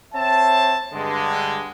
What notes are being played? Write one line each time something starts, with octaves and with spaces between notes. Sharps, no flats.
C4 C#5 E5 A5
G2 D3 G#3